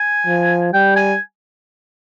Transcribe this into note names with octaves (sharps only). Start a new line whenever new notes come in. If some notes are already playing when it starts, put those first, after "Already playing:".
Already playing: G#5
F3
G3 G5
G#5